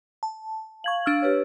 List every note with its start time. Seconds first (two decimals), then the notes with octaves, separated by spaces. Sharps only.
0.23 A5
0.84 F5 C#6 G#6 F#7
1.06 D4 E6 F6
1.22 G4 B4 C#5